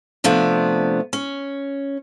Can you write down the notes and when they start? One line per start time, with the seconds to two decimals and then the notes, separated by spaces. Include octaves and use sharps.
0.24 C3 F3 A3 B3 D4
1.13 C#4